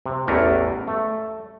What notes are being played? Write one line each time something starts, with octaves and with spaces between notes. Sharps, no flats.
C3
A1 E2 E3 A3 A#4
A3